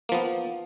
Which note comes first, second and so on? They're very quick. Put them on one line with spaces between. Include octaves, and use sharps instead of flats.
A#3 F3 B3